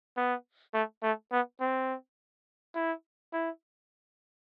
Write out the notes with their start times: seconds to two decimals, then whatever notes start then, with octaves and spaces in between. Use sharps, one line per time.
0.17 B3
0.74 A3
1.03 A3
1.32 B3
1.60 C4
2.75 E4
3.33 E4